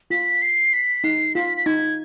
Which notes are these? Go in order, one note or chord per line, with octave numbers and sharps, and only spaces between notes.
F4 B6
C7
B6
D#4 C7
F4 B6
B6
D#4 G#6